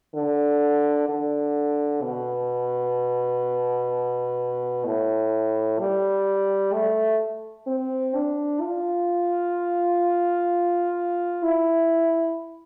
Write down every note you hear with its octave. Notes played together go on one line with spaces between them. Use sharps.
D3
D3
B2
A2
G3
A3
C4
D4
F4
E4